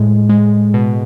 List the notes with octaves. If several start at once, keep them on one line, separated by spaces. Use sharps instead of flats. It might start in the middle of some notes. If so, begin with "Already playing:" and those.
Already playing: A2 G#3
G#3
B2